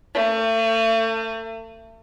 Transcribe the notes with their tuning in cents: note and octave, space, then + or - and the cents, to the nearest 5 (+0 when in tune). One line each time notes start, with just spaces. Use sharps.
A3 +40